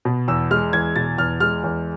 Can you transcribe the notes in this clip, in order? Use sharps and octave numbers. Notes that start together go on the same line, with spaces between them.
B2
E2 E6
G#3 F6
E2 G#6
B2 A6
E2 F6
G#3 F6
E2